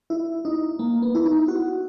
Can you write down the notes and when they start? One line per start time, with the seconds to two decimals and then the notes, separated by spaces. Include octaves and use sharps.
0.10 E4
0.45 D#4
0.79 A#3
1.02 B3
1.15 E4
1.25 D#4
1.48 F#4